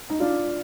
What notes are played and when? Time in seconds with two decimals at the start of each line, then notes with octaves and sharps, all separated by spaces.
0.10 D#4
0.20 D4 F4